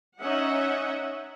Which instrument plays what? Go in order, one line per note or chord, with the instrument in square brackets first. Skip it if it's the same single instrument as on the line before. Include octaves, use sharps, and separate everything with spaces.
[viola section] C#4 D#4 D#5 E5 F#5